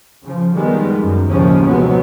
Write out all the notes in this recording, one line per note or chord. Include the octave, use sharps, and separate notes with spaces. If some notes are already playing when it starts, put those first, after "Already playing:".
C#3 F3
D#3 G3 G#3 B3
F#2
D#2 A2 C#3 F3 G#3 C#4
C3 F3 F#3 G#3 B3